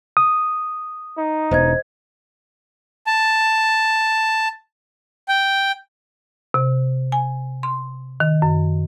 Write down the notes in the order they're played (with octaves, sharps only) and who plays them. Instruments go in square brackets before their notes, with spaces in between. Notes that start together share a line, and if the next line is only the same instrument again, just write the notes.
[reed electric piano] D#6
[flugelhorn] D#4
[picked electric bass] E1 [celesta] C5 D#5 G#6
[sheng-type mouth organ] A5
G5
[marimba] C3
G#5
C6
D#3
F#2